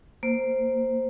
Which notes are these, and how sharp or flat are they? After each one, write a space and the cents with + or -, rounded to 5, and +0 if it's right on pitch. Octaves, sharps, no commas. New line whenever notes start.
A#3 +0 C5 +0